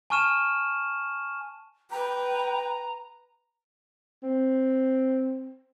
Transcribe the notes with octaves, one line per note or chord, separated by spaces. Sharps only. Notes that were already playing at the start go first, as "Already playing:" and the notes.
G#5 A5 C#6 F6 D#7 E7
B4 G5 A#5
C4